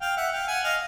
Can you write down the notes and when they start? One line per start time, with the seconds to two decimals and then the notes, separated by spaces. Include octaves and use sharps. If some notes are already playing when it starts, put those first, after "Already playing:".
0.01 F5 G5
0.17 E5 F#5
0.32 F5 G5
0.48 F#5 G#5
0.64 D#5 F5